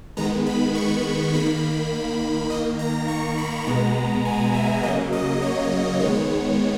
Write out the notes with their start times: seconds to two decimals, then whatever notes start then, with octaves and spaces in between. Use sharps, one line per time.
0.17 D#3 G#3 B3 A#5
0.46 B5
0.75 C#6
1.33 D#3 A#3 B5
2.50 D#3 A#3 D#5
2.79 A#5
3.08 C#6
3.38 B5
3.67 B2 G#3 B3 A#5
4.25 G#5
4.54 E5
4.83 C#3 F#3 A#3 D#5
5.13 D#5
5.42 C#5
6.00 D#3 G#3 B3 C#5